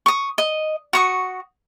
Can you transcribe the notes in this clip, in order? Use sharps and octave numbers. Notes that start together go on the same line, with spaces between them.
C#6 D#6
D#5
F#4 C#6 D#6